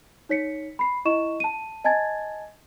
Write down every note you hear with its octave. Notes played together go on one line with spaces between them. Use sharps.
D#4 C#5 B6 C#7
B5 C7
E4 D#5 C#6 E7
A5 D#7
D#5 G#5 A5 G#6 A6